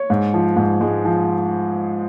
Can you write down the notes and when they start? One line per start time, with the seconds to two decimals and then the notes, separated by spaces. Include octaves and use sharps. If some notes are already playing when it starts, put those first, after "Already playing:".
Already playing: C#5
0.10 G#2
0.34 F3
0.57 G#2
0.81 G#3
1.05 F3